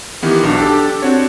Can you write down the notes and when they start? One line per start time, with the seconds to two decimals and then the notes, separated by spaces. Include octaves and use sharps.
0.23 D#3 E3 B3 G4
0.43 B1 D4 F#4
0.59 G4 A4
1.02 C4 D4 F#4 C#5